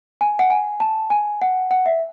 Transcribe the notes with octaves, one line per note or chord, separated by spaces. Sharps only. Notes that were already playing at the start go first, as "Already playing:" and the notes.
G#5
F#5
G#5
A5
G#5
F#5
F#5
E5